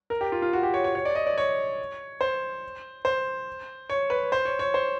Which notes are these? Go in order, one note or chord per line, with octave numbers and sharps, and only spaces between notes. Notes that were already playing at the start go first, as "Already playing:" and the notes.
A#4
G4
F4
F4
F#4
G4
C#5
C#5
C#5
D5
D#5
D5
C#5
C5
C5
C#5
B4
C5
C#5
C#5
C5